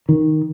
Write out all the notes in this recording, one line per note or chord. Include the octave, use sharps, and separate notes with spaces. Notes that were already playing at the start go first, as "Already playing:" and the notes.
D#3